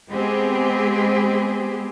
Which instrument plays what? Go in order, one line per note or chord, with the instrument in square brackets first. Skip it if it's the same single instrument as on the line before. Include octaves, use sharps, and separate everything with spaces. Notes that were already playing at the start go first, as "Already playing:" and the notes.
[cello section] G#3 B3 C4 G4 G#4